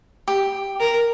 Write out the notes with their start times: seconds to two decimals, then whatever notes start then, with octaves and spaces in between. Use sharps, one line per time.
0.28 G4
0.80 A#4